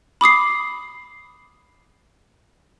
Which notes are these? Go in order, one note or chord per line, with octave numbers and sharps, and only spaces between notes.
B5 D6 D#6 C7